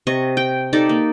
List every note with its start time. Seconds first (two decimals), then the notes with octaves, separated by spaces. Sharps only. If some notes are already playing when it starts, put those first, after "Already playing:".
0.07 C3 D#5 C#6
0.37 G5
0.73 D#4 G4 A4 D5
0.89 A#3